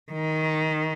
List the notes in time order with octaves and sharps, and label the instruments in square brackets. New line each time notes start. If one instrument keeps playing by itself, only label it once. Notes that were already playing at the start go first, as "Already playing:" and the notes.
[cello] D#3